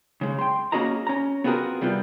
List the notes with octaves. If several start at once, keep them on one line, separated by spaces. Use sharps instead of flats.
C#3 G#3
G5 C6
A#3 C#4 F#4 G#4 D#5 A#5
C#4 A#5
B3 C4 F4 F#4 G#4 A#4
C3 G3 B3 F4